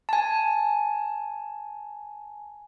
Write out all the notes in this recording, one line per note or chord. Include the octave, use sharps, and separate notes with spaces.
G#5 A5